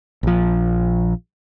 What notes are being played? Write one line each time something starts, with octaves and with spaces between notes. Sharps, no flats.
A#1 F3